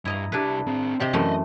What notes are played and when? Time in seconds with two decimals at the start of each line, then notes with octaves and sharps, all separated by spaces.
0.05 G2 E4 D#5 A#5
0.32 C2 D4 E4 G4 B4
0.67 C4 G#4
1.00 C3 C4 G4 D5 D#5
1.13 F#2 E3 A3